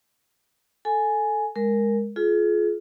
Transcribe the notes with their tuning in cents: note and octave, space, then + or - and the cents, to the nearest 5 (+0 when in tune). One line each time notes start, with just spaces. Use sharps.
A4 +0 G#5 +5
G#3 +0 A#4 +0
F4 +0 G#4 +35